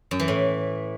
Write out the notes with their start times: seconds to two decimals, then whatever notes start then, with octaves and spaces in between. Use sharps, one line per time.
0.11 F#2
0.20 E3
0.28 A2